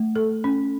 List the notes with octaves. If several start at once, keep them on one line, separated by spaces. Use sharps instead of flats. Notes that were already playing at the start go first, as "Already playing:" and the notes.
Already playing: A3
A4
C#4